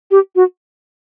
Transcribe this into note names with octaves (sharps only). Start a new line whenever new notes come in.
G4
F#4